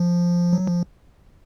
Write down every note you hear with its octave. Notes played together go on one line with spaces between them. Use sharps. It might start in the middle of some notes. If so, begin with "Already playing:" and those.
Already playing: F3
F#3
F3